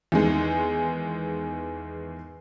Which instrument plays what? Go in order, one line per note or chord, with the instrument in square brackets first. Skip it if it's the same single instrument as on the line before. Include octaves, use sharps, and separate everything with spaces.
[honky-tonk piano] E2 D#3 G#3